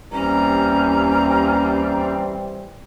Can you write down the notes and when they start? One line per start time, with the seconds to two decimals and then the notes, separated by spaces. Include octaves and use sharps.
0.12 D#2 E3 G3 C4 C#4 A#5